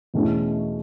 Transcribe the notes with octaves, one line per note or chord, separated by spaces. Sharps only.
E2 B2 A3 C#4 E4